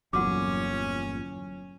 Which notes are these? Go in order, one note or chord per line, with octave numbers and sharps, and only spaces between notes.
G1 E2 A#2 F#3 C#4 F#5 C6 D6